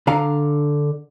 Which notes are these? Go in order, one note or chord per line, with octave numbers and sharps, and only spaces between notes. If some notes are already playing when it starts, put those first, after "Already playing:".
D3 D4 F5 A#5